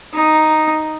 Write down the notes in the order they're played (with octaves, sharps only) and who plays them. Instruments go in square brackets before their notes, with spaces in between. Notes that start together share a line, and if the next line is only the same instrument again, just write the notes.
[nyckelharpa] D#4